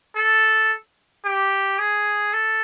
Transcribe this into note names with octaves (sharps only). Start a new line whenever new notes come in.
A4
G4
G#4
A4